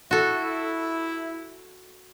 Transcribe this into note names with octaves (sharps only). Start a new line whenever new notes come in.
E4 F#4 A4